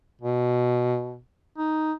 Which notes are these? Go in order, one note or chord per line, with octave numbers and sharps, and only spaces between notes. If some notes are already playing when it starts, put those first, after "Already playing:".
B2
D#4